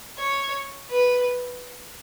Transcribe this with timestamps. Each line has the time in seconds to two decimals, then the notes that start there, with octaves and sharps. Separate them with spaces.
0.19 C#5
0.91 B4